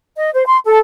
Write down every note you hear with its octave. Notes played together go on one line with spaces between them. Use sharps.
D#5
C5
C6
A4